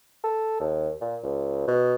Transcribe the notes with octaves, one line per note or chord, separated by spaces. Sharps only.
A4
D#2
A#2
C#2
B2